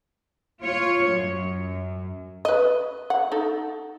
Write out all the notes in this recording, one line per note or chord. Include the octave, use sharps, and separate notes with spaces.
F4 C#5
F#2
B4 D#5
F#5
D#4 A4